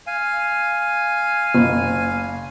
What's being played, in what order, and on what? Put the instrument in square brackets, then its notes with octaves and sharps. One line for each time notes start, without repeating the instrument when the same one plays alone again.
[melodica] F5 G#5
[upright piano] F#1